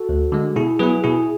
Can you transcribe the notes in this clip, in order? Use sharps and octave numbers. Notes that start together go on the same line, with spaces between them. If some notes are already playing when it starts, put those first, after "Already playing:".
Already playing: F#4 A4
D2
D3 G#3
B2 E4 G#4
F#3 B3 E4 G#4 B4
B2 E4 G#4